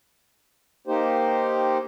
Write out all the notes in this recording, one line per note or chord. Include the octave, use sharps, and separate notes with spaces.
A#3 D#4 G4 C5